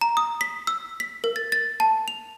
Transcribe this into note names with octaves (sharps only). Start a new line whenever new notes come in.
A#5
D#6
B6
E6
B6
A#4
A6
A6
A5
F7